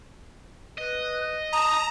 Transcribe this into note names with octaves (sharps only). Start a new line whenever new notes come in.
B4 D#5
A5 A#5 D#6